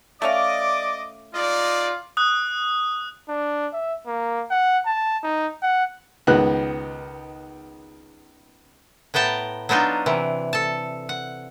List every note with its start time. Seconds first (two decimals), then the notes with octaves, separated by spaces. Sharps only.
0.22 A3 C#4 D5 D#5 F5 D6
1.34 G#3 D#4 F4 D5
2.17 D#6 F#6
3.29 D4
3.73 E5
4.07 A#3
4.51 F#5
4.86 A5
5.23 D#4
5.62 F#5
6.27 C#2 D#3 G#3 B3 F#6
9.14 A2 B3 G5 A5 A#5
9.69 F#3 B3 D4 D#4 F4
10.06 C3 E3
10.53 A4 A5
11.09 F#5